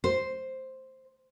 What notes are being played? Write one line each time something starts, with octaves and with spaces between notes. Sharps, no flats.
C5